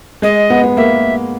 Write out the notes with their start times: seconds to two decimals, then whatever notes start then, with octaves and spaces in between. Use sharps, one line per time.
0.22 G#3 D#5
0.50 B3
0.64 B3
0.77 A#3 E5